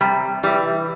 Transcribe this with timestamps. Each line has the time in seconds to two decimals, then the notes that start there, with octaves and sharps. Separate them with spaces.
0.01 C3 G3
0.43 E3 G3